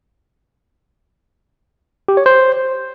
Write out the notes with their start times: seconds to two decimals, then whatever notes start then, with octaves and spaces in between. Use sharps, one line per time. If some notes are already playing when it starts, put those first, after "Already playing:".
2.08 G4
2.17 C#5
2.26 C5